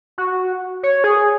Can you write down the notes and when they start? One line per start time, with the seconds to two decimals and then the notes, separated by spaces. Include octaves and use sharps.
0.18 F#4
0.83 C#5
1.04 G#4